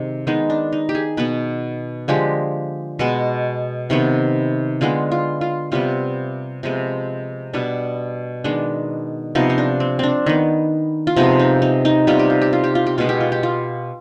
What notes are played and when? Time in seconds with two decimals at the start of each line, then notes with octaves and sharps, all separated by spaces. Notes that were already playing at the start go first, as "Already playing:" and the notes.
Already playing: C3 D#3 G#3
0.27 D#3 G#3 B3 D#4
0.50 D4
0.72 D#4
0.89 G4
0.95 G#4
1.17 B2 B3 B4
2.08 D3 F3 G#3 G4
2.99 B2 G#3 B3
3.90 C3 D#3 B3
4.81 D3 G#3 B3 F4
5.12 F4
5.41 F4
5.72 C3 G3 B3 F4
6.63 C3 F3 G#3 B3
7.53 B2 G3 B3 D4
8.44 D#3 G#3 B3 D4
9.35 C3 F3 B3 D#4
9.50 D#4
9.58 D4
9.80 C4
9.99 C4 D4
10.26 D#3 B3
11.07 F4
11.16 C3 F3 G#3 B3 D#4
11.39 D#4
11.62 D#4
11.85 D#4
12.07 C3 G3 B3 F4
12.19 G4
12.30 F4
12.42 G4
12.53 F4
12.64 G4
12.75 F4
12.87 G4
12.98 B2 G#3 B3 F4
13.09 G4
13.21 F4
13.32 G4
13.43 F4